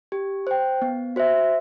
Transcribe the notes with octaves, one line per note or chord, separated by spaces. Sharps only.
G4
C5 G5
B3
F#4 C5 E5